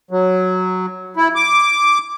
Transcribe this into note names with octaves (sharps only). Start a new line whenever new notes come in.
F#3
E4
D6